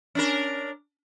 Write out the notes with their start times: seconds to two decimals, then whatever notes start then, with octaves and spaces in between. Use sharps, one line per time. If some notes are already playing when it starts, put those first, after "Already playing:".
0.15 C#4 D4 A#4